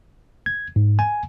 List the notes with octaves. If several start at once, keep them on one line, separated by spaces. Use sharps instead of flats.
G#6
G#2
G#5